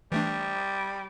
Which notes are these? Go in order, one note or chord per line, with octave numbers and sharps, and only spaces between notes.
E3 G3 A3 D4